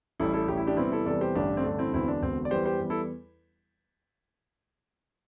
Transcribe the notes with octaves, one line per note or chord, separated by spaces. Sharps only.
A1 A2 G3 E4 A4
E4 A4
A1 A2 G3 G4
E4
D4 G4
E2 C3 E3 G3 C4 E4
E4 A4
E2 C3 E3 G3 A4 D5
G4 C5
A1 G2 D3 A3 D4 G4
C4
A1 G2 D3 A3 D4
C4 E4
E1 E2 D3 C4 E4
D4
E1 E2 D3 C4
D5
E2 E3 G3 G4 C5
G4 C5
E2 E3 G3
E4 A4